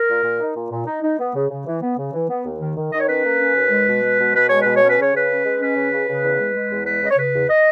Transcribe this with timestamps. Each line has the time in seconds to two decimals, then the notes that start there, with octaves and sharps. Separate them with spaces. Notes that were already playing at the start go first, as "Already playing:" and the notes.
Already playing: A#4
0.08 A#2
0.24 A#2
0.40 D#4
0.55 A#2
0.71 A#2
0.87 D#4
1.02 D#4
1.19 B3
1.35 C#3
1.50 C#3
1.66 E3
1.81 B3
1.98 C#3
2.13 E3
2.29 B3
2.45 D#2
2.61 D#3
2.76 D#3
2.93 D#3 D#5
3.00 C#5
3.08 C#4 B4
3.24 A#3
3.40 C#4
3.55 D#2
3.71 G#3
3.86 B2
4.02 G#3
4.19 B2
4.34 B2 B4
4.48 G#3 C#5
4.60 B2 B4
4.74 C#5
4.82 C#4
4.89 B4
4.98 C#3 C#5
5.13 C#3 B4
5.29 C#4
5.44 G#3
5.60 C#4 B4
5.76 C#3
5.92 C#3
6.07 C#3
6.23 E2
6.39 G#3
6.55 G#3
6.71 E2
6.86 G#3 B4
7.02 C#3 D#5
7.11 C#5
7.18 C#3 B4
7.34 E2
7.50 D#5